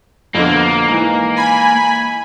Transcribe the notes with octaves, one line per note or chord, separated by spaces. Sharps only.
F2 B2 D3 A#3
G#2 E3
G#5 B5